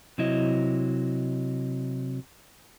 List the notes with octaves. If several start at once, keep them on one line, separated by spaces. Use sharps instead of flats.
C3 F#3 E4 D#5